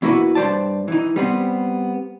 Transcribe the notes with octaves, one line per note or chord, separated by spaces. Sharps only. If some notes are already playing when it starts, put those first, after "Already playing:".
E2 A#3 E4 F#4 B4
G2 F3 C5 D5 A5
E3 D#4
G3 B3 C4